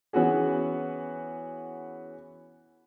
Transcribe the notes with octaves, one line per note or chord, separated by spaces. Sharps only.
E3 B3 C#4 F#4 G#4